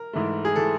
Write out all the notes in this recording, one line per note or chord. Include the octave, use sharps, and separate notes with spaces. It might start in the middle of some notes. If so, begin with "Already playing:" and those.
Already playing: A#4
G#2 E3 A3
G#4
E3 A3 A4